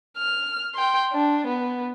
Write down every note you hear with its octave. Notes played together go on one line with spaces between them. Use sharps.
F6
G5 C6
D4
B3